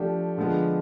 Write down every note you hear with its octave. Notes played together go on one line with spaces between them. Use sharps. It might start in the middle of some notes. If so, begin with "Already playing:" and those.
Already playing: F3 A3 D4 G4
D3 F3 G#3 B3